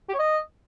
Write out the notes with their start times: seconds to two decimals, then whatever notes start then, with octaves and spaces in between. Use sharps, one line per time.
0.09 G4
0.14 C#5
0.19 D#5